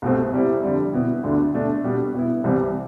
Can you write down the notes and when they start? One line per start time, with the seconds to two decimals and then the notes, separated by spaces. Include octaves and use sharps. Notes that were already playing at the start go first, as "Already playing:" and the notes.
0.02 C2 B2 A3 C4
0.33 C3 G3 C4 E4
0.63 F2 D3 G3
0.93 B2 B3 E4
1.23 D2 D3 A3 D4
1.53 B2 A3 D4
1.84 B2 G3 D4
2.14 B2 B3 E4
2.44 C2 C3 E3 G3 C4